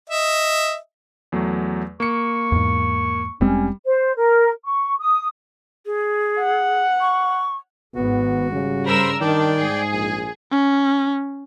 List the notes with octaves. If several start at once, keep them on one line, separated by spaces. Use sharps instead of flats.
D#5 E5
E2 F#3 A3
A#3 C#6 C#7
E2 G#2
F1 G3 G#3 C4 C#4
C5
A#4
C#6
D#6
G#4
F#5
C#6
G#1 B3 F#4
C#3 G3
G2 A#4 C5 B5 C6 E6
D#3 D4 D5 G5
G#2 G#4
A#1 G#5
C#4